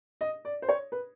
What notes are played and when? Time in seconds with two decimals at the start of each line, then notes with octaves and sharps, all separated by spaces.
0.21 D#5
0.45 D5
0.62 C5
0.69 C#5
0.92 B4